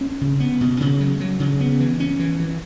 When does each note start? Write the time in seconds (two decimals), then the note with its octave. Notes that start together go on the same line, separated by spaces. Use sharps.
0.01 C#4
0.21 C#3
0.40 B3
0.61 B2
0.80 C#3
1.00 F#3
1.20 F#3
1.40 C#3
1.60 B3
1.80 E3
2.00 C#4
2.19 E3
2.40 E3